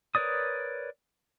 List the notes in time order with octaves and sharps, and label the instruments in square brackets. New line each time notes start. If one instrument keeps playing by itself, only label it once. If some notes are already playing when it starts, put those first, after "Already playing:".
[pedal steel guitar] A#4 B4 C#5 D5 D#6